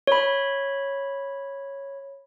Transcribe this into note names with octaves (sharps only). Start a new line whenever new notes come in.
C#5 B5